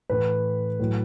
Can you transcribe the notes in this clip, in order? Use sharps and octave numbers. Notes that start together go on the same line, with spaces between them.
A2 E3 B4
A2 F#3